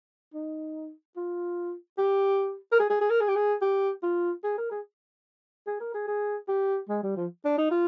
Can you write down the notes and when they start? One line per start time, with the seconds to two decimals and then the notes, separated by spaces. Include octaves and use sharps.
0.34 D#4
1.16 F4
1.98 G4
2.72 A#4
2.79 G#4
2.90 G#4
3.01 G#4
3.10 A#4
3.21 G#4
3.28 G4
3.35 G#4
3.62 G4
4.03 F4
4.44 G#4
4.58 A#4
4.71 G#4
5.67 G#4
5.80 A#4
5.94 G#4
6.08 G#4
6.48 G4
6.89 G#3
7.03 G3
7.17 F3
7.45 D4
7.58 D#4
7.71 F4